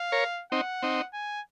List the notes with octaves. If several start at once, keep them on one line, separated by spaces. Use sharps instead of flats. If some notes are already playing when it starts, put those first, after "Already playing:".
Already playing: F5
A#4 C#5
C4 D#4 F#5
C4 D#4
G#5